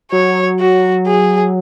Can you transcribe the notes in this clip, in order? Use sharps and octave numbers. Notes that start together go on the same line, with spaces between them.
F#3 C#5
F#4
G#4